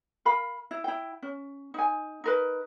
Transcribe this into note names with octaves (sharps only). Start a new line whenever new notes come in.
A#4 F5 B5
E4
E4 G5
C#4
D#4 G#5
D#4 A#4 B4